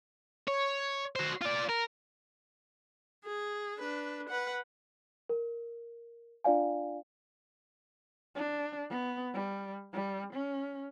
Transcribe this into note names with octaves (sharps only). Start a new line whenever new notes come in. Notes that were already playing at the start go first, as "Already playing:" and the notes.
C#5
F#4 C5
F4 D5
A#4
G#4
D4 B4
B4 F#5
A#4
D4 F4 D5 F5 G#5
D4
B3
G3
G3
C#4